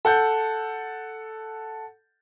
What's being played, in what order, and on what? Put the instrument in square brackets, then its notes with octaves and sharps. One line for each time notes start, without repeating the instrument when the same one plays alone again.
[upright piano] A4 F#5 G6